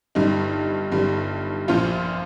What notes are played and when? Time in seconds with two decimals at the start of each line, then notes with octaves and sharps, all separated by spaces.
0.15 G1 G2 G3 D#4
0.92 G1 G2 G3
1.68 A#1 A#2 F3 F4